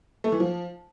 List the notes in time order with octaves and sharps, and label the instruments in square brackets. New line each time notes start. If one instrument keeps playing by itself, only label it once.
[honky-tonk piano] A3
E3
F3